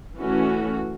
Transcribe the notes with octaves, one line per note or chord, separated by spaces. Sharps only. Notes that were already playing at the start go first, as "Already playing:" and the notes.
E3 A3 C#4 F#4